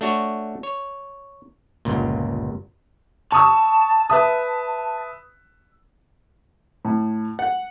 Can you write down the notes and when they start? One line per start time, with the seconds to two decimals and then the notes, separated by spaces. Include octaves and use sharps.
0.01 A3 D4 F#4 C#5
0.63 C#5
1.85 G1 C#2 A#2
3.32 A5 C#6 D#6 E6
4.10 B4 E5 D#6
6.85 A2
7.39 F#5